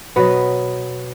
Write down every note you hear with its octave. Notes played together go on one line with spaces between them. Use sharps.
B2 F#3 B3 B4